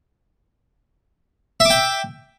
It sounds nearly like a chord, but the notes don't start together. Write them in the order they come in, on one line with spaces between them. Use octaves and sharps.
E5 D6 G5